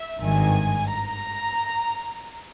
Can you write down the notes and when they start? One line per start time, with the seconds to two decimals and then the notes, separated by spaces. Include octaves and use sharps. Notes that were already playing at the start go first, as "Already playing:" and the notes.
Already playing: E5
0.21 G#1 G2 D#3 G#5
0.91 A#5